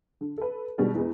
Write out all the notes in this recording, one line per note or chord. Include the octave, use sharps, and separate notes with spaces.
D3
A4 B4
B2 D#3 G3 G#3 D4 F#4
E2 G#3 B3